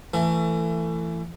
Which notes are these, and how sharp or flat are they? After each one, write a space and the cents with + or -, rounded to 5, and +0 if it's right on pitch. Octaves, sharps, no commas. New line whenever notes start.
E3 +25 A3 +30